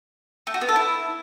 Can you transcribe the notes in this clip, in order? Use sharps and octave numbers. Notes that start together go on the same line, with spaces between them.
A3
F#4
B3
A4
E4